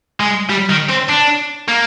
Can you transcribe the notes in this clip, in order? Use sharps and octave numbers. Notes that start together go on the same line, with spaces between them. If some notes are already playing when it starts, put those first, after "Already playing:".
G#3
G3
D#3
C4
D4
A#3